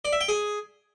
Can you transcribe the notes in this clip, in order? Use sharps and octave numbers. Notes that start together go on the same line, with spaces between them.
D5
E5
G5
G#4